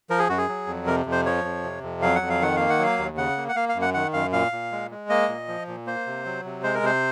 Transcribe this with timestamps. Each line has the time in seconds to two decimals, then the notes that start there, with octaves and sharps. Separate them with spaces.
0.10 F3 A#4
0.19 G#4
0.29 F#2 F#4
0.38 G#4
0.48 F#3
0.67 F2
0.87 C3 A#4
1.06 F2
1.12 C5
1.26 F3 C#5
1.44 F2
1.63 C3
1.83 F2
2.02 F#3 F5
2.15 F#5
2.22 F2
2.30 F5
2.41 D#3 F#5
2.56 A#3 F5
2.70 F#5
2.79 F#3 F5
2.98 D#2
3.17 C#3 F#5
3.37 A#3
3.49 F#5
3.56 A#3 F5
3.69 F5
3.75 F#2
3.82 F#5
3.94 D#3 F#5
4.13 F#2 F5
4.32 A#2 F5
4.52 A#2
4.72 G#3
4.91 G#3
5.10 A#3 D#5
5.29 A#2
5.48 F3
5.67 A#2
5.86 A#3 C5
6.06 C3
6.25 F#3
6.44 C3
6.63 G#3 C5
6.74 A#4
6.83 C3 C5